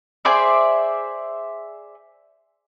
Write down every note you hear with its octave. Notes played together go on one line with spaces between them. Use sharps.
G#4 C5 D5 E5